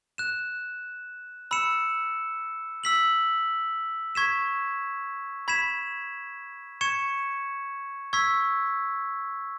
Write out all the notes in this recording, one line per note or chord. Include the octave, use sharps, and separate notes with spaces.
F#6 E7
B5 E6 C#7 E7
E6 B6 F#7
C#6 G#6 B6 E7
B5 G#6 B6 E7
C#6 G#6 C#7 E7
C#6 E6 G#6 B6